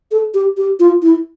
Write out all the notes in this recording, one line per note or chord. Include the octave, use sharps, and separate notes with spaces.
A4
G4
G4
F4
E4